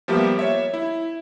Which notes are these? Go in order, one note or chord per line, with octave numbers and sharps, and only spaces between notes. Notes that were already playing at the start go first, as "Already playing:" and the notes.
F3 G3 A#3 B3 G4 E5
C#5 E5
E4